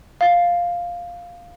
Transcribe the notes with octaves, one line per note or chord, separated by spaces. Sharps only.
F5 A6